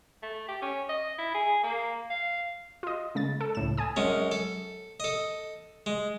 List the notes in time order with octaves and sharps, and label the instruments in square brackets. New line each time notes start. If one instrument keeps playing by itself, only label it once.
[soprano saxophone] A3
G4
C#4
D#5
E4
G#4
A#3
F5
[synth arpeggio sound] F4 D#5
C#3 G#3 A6
A4
C#2 A2 E7
G#5 A5 D#6
[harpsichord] F#2 G#3 C#4
A4
A4 D#5
G#3